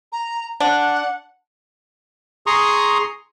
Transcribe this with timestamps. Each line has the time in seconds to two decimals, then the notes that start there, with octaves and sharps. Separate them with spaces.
0.12 A#5
0.60 D4 F#5
2.47 G#4 A#5 C6 C#6 D#6